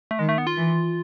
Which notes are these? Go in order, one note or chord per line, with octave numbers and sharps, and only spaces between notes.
A3
D#3 G#3
A3
B3
F4
E3